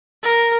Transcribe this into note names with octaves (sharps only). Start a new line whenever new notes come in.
A#4